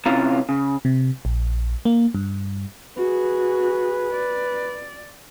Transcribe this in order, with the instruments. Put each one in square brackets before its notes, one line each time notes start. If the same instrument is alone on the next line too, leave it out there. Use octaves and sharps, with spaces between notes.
[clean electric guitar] C3 C#4 E4 F4 F5 A#5
C#3
[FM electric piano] C3
A#1
A#3
G2
[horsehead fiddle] F#4 G#4 [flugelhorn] B4
[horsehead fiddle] D5